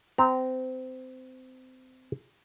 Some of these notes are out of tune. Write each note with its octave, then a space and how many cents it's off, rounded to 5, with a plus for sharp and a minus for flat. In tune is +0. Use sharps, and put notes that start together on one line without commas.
C4 -25 A#5 +0